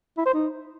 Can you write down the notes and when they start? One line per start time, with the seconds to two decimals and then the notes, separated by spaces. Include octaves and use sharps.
0.18 E4
0.26 C5
0.34 D#4